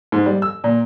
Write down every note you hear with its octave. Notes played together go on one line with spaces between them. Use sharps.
G#2
G3
E6
A#2